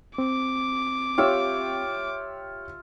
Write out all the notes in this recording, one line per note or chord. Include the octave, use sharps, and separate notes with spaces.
C4 D6
F4 G4 C#5 E5 G5